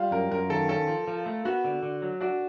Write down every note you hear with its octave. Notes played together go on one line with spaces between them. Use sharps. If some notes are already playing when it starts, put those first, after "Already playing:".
Already playing: G3 F4
F#2 A#4
F#2 A#4
D#3 A4
C#4 A4
F3
F3
A3
B3 F#4
D3
D3
F#3
D4 F#4